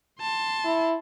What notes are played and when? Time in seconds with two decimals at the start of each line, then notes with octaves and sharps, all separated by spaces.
0.21 A5 C6
0.65 E4